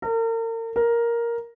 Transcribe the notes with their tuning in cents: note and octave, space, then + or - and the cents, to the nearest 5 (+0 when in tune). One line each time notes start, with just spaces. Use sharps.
A#4 -40
A#4 +5